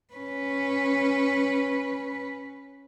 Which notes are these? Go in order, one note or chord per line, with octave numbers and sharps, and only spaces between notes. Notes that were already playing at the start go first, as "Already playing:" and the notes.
C#4 B4